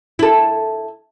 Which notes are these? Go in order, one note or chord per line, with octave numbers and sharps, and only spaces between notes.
E4 A4